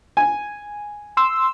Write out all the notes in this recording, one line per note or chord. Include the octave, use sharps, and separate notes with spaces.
G#5
C6 E6